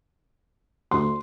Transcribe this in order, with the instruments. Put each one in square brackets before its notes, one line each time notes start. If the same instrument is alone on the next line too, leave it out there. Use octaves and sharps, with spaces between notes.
[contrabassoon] D2 [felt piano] C6